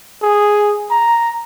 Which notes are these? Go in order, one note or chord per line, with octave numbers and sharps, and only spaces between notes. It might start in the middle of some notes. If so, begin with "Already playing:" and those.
G#4
A#5